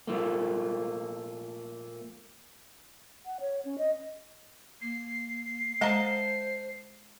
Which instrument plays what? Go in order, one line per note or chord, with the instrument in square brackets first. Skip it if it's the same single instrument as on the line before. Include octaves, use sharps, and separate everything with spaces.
[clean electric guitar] A#2 F3 A3 A#3
[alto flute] F#5
C#5
C#4
D#5
[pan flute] A#3 [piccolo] C7
[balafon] G#3 A#5 [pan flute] C5 [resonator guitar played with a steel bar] D#5 F5 A5